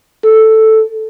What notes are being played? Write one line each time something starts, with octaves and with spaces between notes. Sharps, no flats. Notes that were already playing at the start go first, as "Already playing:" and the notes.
A4